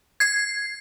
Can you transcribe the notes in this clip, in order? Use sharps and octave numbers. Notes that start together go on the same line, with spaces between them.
G#6 C7